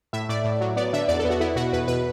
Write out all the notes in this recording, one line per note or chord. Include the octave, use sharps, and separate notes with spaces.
A2 E5
A2 D5
A2
F#3
B3 D5
D3 E5
E2 D5
A4
B3
F#4
B3 E4
B2 F#4
E2 B4
B2 B4